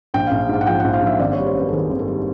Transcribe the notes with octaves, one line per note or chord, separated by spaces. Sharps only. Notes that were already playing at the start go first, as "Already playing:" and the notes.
A#1 G5
A#1 F5
G#2 F5
F#5
F3 G5
F#5
A#1
F5
A#1 E5
G#1 D5
C#5
G3
C5
F#2 B4
A4
D#3 G#4
G#1
A4
G3